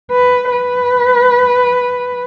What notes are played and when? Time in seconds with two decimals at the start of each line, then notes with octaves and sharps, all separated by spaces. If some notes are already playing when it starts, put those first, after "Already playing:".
0.11 B4
0.52 B4